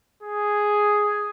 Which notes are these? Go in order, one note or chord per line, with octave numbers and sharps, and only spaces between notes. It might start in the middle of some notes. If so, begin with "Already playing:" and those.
G#4